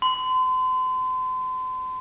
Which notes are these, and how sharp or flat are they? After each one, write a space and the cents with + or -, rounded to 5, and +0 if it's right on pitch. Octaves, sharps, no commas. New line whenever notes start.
C6 -35